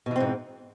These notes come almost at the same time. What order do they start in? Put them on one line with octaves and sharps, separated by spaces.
B2 E3 C4 G#2